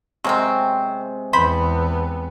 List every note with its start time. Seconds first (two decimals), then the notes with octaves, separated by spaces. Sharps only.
0.24 C3 F#3 G#3 A#3 C4 C#6
1.33 E2 B3 C5 B5